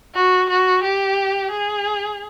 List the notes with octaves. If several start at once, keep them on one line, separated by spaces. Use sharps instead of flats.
F#4
F#4
G4
G#4